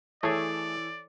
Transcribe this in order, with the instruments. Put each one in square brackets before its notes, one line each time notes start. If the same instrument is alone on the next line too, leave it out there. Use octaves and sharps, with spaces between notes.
[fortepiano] E3 A4 C#5 [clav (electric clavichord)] A3 G#4 [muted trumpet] D5